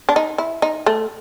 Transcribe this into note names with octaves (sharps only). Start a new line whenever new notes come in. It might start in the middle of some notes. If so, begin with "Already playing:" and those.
D4
D#4
E4
D#4
A3